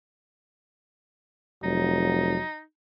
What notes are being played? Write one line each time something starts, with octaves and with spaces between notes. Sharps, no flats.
F1 F#3 D#4